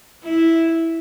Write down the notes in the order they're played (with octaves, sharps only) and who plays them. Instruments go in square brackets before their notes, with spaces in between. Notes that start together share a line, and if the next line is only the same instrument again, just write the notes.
[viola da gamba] E4